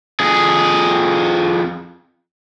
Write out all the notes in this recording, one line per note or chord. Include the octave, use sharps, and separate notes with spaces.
F2 G#4